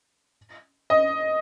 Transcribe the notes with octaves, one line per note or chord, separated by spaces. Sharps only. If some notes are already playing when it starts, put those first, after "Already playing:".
D#5